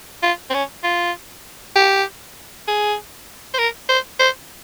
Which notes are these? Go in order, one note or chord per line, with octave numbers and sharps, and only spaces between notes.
F4
C4
C#4
F4
G4
G#4
C5
A#4
C5
C5